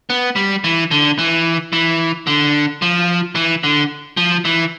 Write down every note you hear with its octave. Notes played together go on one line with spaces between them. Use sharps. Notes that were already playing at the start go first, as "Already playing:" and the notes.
B3
G3
E3
D3
E3
E3
D3
F3
E3
D3
F3
E3